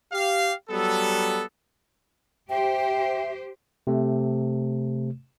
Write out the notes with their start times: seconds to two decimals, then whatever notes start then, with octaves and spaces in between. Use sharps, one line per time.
0.12 G4 F5
0.70 F#3 G3 B3 A4
2.50 G4 C5 E5 G5
3.87 C3 A3